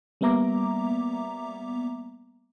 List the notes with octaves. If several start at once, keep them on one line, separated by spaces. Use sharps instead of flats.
G3 A#3 B3 E5 A#5 D6